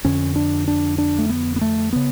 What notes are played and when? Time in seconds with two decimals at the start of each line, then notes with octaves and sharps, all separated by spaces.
0.05 F2 D3 C#4
0.36 D4
0.68 D4
0.98 D4
1.18 A3
1.29 B3
1.56 B3
1.61 A3
1.93 C#3 B3